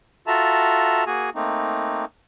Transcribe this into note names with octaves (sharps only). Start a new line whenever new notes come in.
F4 F#4 A4 E5 A5 A#5
A#3 F#4 G#4 G#5
A3 A#3 C4 D#4